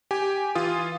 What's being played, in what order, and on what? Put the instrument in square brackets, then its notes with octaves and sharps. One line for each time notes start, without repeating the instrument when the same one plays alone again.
[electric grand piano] G4 G#5
E3 F4 D#6